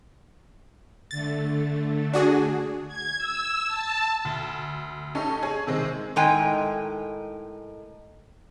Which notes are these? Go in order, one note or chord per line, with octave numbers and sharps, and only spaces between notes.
D3 A3 A6
D4 F#4 G#4
G#6
E6
A5
D2
A3 C#4 D#4 G4 A4
G#4 C#5 G#5
C3 D#3 G#3 C4
A2 D#3 G#3 D#4 G5 G#5